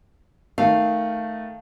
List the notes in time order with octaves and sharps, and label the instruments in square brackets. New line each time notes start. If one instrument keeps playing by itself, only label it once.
[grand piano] D#3 A3 [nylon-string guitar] F5